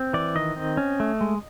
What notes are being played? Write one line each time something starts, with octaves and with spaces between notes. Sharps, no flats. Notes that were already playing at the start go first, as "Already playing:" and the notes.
Already playing: C4
E3 D5
D#3 D#5
C4
C#4
A3
G#3